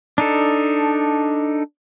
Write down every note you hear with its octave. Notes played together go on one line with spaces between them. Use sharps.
D4 D#4 A4